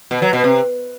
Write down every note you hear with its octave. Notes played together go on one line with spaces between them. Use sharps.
B2
F#3
B2
C3